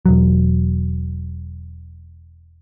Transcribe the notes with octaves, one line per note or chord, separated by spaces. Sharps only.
E1 F#3